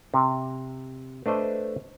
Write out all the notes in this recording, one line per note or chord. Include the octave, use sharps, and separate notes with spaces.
C3
A3 D4 B4 C5 D#5